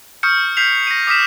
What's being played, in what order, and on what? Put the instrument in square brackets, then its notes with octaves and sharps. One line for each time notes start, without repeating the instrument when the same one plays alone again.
[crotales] C#6 D#6 F6 G6 C#7
F6 G6 B6 C7 F7
A#6 D#7
D6 D#6 F6 B6 E7